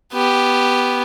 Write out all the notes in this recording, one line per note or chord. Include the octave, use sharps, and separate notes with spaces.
B3 G4